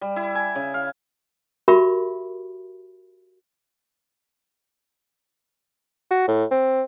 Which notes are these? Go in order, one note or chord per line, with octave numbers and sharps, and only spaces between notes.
G3
E4
G#5
C#3
F5
F#4 G4 A#4 E5 B5 C#6
F#4
A2
C4